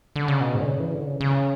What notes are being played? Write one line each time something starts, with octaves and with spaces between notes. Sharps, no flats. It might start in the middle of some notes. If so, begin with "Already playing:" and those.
D3
C#3
B2
G#2
D3
C#3
E3
D3
C#3
C#3